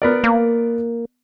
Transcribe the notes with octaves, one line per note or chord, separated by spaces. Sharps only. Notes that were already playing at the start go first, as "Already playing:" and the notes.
B3 A#4 D5
A#3